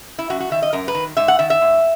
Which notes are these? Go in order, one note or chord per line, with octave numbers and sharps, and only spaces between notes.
E4
F#2 F#4
F#4
D#3 E5
D#5
F#2 A#4
B4
D#3
G#2 E5
F#5
D#3 E5
E5
G#2